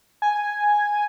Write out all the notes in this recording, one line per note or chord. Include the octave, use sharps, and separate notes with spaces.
G#5